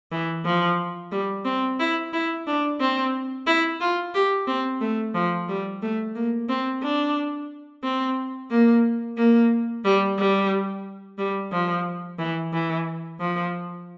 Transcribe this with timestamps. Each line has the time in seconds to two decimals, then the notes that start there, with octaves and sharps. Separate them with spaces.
0.12 E3
0.45 F3
1.12 G3
1.45 C4
1.79 E4
2.13 E4
2.47 D4
2.81 C4
3.47 E4
3.81 F4
4.14 G4
4.47 C4
4.81 A3
5.15 F3
5.48 G3
5.82 A3
6.15 A#3
6.49 C4
6.83 D4
7.84 C4
8.51 A#3
9.18 A#3
9.84 G3
10.18 G3
11.18 G3
11.52 F3
12.19 E3
12.53 E3
13.20 F3